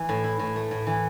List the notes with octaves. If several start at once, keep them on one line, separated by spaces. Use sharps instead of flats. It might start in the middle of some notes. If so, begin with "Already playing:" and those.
Already playing: E3
A2
E4
A2
A3
A2
E3